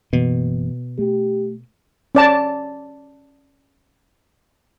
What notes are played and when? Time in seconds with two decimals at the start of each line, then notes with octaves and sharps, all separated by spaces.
0.13 F#1 B2 E3 A#3
0.99 A3 G4
2.15 C#4 D5 A5